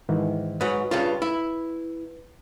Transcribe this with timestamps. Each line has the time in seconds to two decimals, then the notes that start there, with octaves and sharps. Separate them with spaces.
0.09 G#2 D#3 E3
0.61 G#2 F#3 B4
0.91 G2 C#3 F4
1.22 E4